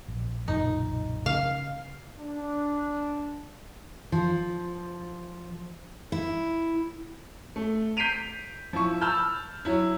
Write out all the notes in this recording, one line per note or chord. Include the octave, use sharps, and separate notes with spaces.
A#1
F#1 B1 A#2 D#4
C#3 F5
D4
F3
E4
A3
G6 B6 C7 D7 D#7 F7
F3 E4 C#6
A5 B5 E6 F6 G6
F#3 E4